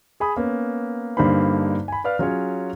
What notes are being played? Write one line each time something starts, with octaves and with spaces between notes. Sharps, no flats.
G#4 G#5 B5 D#6
A#3 B3 C#4
G2 D3 A#3 D#4 C5 B5
G#5 B5
B4 D5 F5 F6
F#3 C#4 F4 G#4 C#5